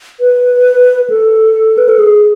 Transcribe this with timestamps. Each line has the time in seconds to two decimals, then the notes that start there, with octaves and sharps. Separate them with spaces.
0.20 B4
1.10 A4
1.78 B4
1.89 A4
1.99 G#4